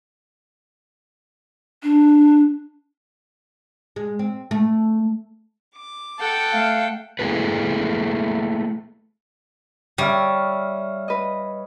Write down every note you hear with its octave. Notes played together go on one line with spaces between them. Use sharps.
D4
G#3
C4
A3
D6
A4 F#5 G5
A3 F5 A5
A3 A#3 E4 G#4 A4 B4
G3 C#5 E5 F5
B4 D#5